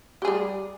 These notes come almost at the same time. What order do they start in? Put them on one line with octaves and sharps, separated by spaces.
G4 G#4 G3